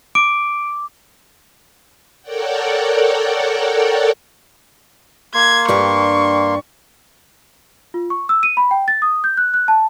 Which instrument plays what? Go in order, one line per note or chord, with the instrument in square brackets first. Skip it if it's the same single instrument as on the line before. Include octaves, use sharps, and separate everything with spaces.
[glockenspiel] D6 [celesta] D7
[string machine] A4 A#4 C#5 D5 F#5 G5
[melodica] A#3 C6 [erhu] G#6
[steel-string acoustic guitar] G2 D4 G4 [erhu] C#6
[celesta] F4
C#6
E6
D#7
B5
G5
A6
D#6
G6
F#6
F#6
A5